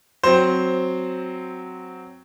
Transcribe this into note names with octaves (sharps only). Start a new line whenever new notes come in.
F#3 C4 C5